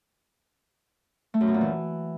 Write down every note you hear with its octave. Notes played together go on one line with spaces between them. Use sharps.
A3
F#2
B2
A#2
E3